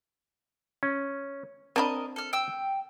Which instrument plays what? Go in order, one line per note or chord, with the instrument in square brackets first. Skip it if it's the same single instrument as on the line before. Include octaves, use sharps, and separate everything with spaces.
[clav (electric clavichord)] C#4
[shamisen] C4 D4 B5 [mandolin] A#4 D#5 [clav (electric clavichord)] A5
[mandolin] A4 F6
G5 E6